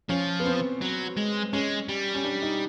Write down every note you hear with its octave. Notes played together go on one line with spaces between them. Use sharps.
F3 C#4
B3
C4
F#3
G#3
G#3 C#4
G3
C#4
D4
D#4